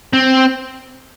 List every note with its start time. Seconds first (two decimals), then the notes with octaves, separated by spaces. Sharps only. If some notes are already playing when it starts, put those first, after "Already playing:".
0.13 C4